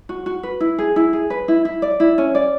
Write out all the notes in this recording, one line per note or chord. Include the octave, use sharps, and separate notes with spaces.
F#4
F#4
B4
E4
G#4
E4
G#4
B4
E4
E4
D5
E4
C#4
D5